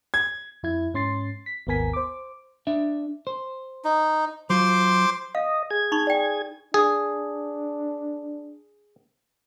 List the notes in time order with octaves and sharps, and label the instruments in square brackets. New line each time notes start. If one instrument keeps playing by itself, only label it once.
[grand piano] G#6
[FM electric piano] F2 E4 G#6
G#2 C#4 C6 A6 C7
B6
G#1 D#2 B3 A#4 G#5 B6
C5 D6
[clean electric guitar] D4 E5
C5
[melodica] D#4
[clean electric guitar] F#3 F4 [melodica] C5 C6 D6
[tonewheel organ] D#5 [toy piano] F5
[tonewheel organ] G#4 G#6
[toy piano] D#4 B5 C#6
D5 G5
[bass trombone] D4 [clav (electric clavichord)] G#4